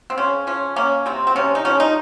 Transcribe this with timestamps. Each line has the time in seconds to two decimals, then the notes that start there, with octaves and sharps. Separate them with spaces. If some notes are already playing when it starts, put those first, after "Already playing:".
0.10 C4
0.18 C#3 C#4
0.47 F3 C#4
0.76 A#3 C#4
1.06 C3 C4
1.27 C4
1.36 C3 C#4
1.55 D#4
1.65 F3 C#4
1.80 D#4